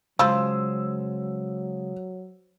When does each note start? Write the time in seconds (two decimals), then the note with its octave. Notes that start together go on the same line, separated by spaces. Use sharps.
0.19 C#3 F3 F#3 G#3 E6